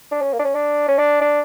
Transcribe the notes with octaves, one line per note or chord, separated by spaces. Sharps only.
D4
C#4
A#3
D4
C#4
D4
C#4
D4
D4